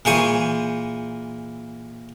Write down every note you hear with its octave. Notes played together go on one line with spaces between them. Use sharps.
A#2 E3 G#4 C5 C#6 D#6